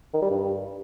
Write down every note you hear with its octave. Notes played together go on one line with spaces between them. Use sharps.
D#3
G3
G2